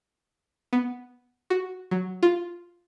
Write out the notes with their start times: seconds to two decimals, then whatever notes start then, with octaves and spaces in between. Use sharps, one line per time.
0.73 B3
1.50 F#4
1.91 F#3
2.23 F4